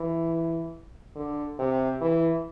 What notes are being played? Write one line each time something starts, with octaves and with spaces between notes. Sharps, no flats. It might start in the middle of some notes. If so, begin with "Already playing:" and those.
Already playing: E3
D3
C3
E3